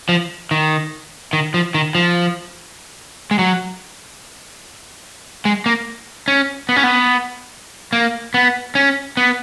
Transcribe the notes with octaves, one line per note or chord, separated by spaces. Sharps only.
F3
D#3
D#3
F3
D#3
F3
G#3
F#3
G#3
A#3
C#4
B3
C#4
B3
A#3
B3
C#4
B3